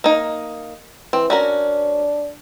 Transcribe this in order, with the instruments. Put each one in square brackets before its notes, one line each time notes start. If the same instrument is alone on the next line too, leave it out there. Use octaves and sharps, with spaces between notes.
[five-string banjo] A#3 D#4
[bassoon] E3 [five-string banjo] C4
[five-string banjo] C#4 F#4 A#4 [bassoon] D4